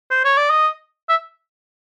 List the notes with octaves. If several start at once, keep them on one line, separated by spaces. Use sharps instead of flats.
C5
C#5
D5
D#5
E5